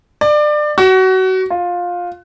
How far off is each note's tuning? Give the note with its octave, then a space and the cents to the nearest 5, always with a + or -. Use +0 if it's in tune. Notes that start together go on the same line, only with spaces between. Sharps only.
D5 +25
F#4 +25
F4 +15